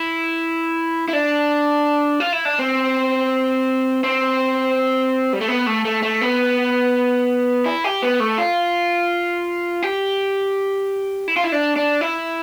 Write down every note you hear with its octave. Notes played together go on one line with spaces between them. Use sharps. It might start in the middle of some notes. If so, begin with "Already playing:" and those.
Already playing: E4
E4
D4
F4
E4
D4
C4
C4
G3
A3
B3
A3
A3
A3
B3
E4
G4
B3
A3
F4
G4
E4
F4
E4
D4
D4
E4